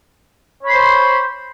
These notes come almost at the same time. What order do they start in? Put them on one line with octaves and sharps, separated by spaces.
C#5 B5 C6 C5